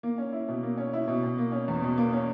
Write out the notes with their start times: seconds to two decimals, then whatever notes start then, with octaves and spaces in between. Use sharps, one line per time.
0.03 A#3
0.18 C#4
0.32 E4
0.48 B2
0.63 A#3
0.77 C#4
0.93 E4
1.08 B2
1.23 B2
1.38 A#3
1.52 C#4
1.68 E2
1.83 B2
1.98 A#3
2.13 C#4